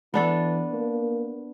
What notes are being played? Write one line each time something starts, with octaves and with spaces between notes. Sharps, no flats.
E3 B3 D4 A4
A#3